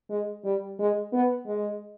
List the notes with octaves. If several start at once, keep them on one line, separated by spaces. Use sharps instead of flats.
G#3
G3
G#3
B3
G#3